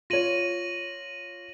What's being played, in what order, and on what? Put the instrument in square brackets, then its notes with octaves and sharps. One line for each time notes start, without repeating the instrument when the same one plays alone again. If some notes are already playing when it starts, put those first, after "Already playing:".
[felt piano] F4 C#5 [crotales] A#6 D#7 F#7